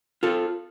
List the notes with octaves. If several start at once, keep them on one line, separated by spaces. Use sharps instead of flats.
F4 A4